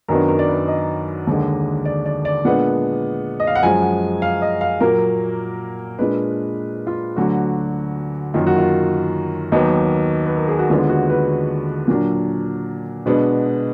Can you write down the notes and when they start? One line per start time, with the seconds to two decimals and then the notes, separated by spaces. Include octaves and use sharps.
0.08 F#2 D#3 F#3 B3 D4 A#4
0.29 A#4
0.39 D5
0.49 B4
0.68 D#5
1.27 D#2 D3 G#3
1.85 D5
2.06 D5
2.25 D5
2.45 A#2 G#3 B3 D4 F#5
3.40 D#5
3.47 F5
3.55 F#5
3.63 F#2 F3 G#3 G#5
3.82 F#5
4.22 F5
4.42 D#5
4.61 F5
4.80 A#2 F#3 A#3 A#4
5.99 A#2 G#3 D4 B4
6.87 F4
7.16 D2 D3 F#3 F#4
8.34 F#2 D#3 A#3 F4
8.47 F#4
8.58 F4
9.52 D#2 D#3 F#3 B3 D#4
10.26 B4
10.37 A#4
10.48 G#4
10.59 F#4
10.69 D#2 D3 G#3 B3 F4
10.89 F#4
11.10 B4
11.88 A#2 F#3 D4
13.06 B2 G#3 B3 D4